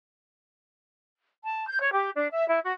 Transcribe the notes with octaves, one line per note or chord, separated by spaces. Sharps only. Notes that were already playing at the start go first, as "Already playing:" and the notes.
A5
G6
C#5
G4
D4
E5
E4
F#4